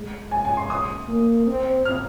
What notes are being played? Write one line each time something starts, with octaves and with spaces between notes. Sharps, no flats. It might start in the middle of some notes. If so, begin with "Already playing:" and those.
Already playing: G#3
G#5
G#5
C6
D#6
A#3
C4
F6